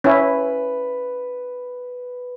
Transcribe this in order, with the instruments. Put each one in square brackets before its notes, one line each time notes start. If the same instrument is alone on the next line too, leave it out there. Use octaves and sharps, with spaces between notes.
[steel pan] C#4 E4 [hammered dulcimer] B4